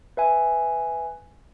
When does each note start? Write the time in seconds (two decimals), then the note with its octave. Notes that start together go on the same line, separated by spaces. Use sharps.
0.17 B4 E5 G#5